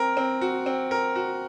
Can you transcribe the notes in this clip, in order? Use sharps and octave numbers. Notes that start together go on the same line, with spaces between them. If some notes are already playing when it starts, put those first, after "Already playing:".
Already playing: C4 A#4
C4
F#4
C4
A#4
F#4